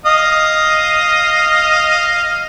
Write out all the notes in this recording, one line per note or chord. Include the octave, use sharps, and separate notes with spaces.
D#5 F5 D#6